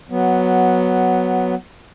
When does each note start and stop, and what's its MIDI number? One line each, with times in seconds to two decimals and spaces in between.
0.10 1.55 54
0.10 1.55 59